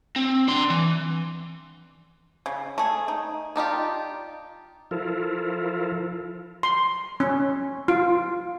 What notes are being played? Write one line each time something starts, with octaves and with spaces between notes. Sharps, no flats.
C4
D4 C6
E3
C#3
A3 G#4
D#4
D4 D#4 F4 G4
F3 E4 F4 A4 A#4
C6
C#4
F4